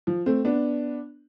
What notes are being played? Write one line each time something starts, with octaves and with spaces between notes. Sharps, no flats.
F3
A3 C4
B3 D4